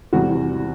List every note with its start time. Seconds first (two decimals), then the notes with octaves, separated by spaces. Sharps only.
0.13 E2 C3 E3 G3 F#4